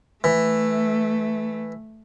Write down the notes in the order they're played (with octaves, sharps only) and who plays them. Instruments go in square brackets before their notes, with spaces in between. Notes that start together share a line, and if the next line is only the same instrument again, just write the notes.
[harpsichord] E3 [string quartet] A3